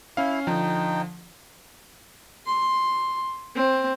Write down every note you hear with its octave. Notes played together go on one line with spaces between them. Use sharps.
C#4 E4 F5
D3 F3 D#4 G5
C6
C4